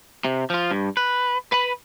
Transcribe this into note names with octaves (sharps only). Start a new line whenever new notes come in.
C3
F3 F4
G2
B4
B4 B5